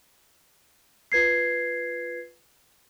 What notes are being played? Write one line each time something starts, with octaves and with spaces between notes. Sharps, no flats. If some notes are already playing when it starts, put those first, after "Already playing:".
F4 B4 G#6 C7